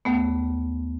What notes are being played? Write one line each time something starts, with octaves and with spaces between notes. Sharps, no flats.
D#2 A3 B3